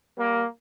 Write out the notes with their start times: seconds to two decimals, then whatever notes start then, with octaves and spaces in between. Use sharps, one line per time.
0.17 G3 A#3